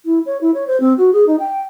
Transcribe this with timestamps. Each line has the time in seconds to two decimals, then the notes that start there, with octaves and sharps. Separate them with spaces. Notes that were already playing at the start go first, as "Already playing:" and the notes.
0.05 E4
0.26 C#5
0.41 E4
0.54 C#5
0.67 C5
0.80 C4
0.98 F#4
1.13 G#4
1.27 D#4
1.39 G5